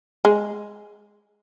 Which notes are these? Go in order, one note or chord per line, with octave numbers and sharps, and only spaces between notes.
G#3